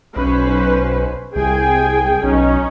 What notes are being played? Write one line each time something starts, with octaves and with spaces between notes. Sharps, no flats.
B1 C#4 B4 C5
C2 G#4 G5 G#5
B1 C#4 D#4